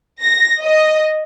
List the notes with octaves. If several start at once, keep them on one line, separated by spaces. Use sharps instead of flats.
A#6
D#5